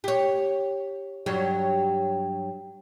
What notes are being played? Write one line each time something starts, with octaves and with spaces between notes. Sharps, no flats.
G4 C#5
G2 F#3 G4